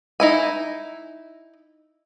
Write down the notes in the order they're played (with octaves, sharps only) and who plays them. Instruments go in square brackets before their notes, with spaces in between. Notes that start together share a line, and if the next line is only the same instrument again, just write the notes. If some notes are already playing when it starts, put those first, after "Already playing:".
[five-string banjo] D#4 E4 G#5